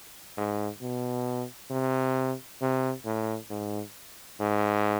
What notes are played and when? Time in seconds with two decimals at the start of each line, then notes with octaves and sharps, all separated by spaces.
0.37 G#2
0.82 B2
1.71 C3
2.61 C3
3.05 A2
3.50 G#2
4.40 G#2